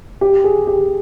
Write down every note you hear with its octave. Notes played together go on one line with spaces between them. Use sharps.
G4
G#4
G4